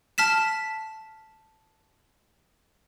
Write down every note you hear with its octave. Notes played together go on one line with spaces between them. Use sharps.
A5 F6 B6 E7